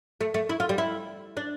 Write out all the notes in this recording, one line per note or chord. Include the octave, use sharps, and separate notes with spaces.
A3
A3
E4
F4
G3
E4
D4